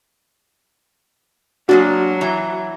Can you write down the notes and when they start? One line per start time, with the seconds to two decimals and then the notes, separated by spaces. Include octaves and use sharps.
1.69 F#3 G#3 A#3 D4 F#4
2.21 E3 A#5